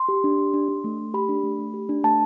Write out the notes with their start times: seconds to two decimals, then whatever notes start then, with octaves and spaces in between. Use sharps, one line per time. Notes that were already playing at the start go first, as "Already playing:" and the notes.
Already playing: C6
0.08 G4
0.24 D4
0.38 G4
0.54 D4
0.68 D4
0.84 A3
0.98 A3
1.14 G4 B5
1.29 D4
1.43 A3
1.59 A3
1.74 G4
1.89 D4
2.04 A3 A5